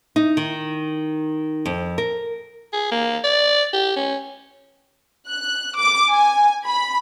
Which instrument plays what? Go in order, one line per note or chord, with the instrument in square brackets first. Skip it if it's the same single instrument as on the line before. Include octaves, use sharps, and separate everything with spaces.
[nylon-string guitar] D#4
D#3
F2
A#4
[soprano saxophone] G#4
A#3
D5
G4
C#4
[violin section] F#6
D6
G#5
B5